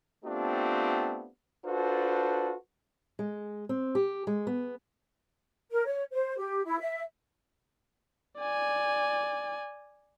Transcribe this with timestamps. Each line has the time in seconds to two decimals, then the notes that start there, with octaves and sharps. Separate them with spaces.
0.24 A3 B3 C4 D4 F4 G4
1.65 D4 F4 F#4 A4 B4 C5
3.19 G#3
3.69 C4
3.95 G4
4.27 G#3
4.47 B3
5.71 A#4
5.86 C#5
6.11 C5
6.37 G4
6.65 E4
6.79 E5
8.38 D5 G#5